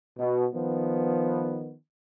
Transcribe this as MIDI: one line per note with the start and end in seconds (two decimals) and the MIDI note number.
0.18 0.46 47
0.53 1.74 51
0.53 1.74 53
0.53 1.74 59